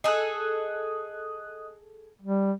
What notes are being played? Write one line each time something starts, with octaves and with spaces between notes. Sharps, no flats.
G#4 A4 D#5 D#6 F#6
G3